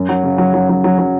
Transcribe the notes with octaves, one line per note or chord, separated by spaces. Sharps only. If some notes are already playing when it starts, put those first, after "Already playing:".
Already playing: F#2
F#3
C#3
F#3
F#3
F#3
F#3
F#3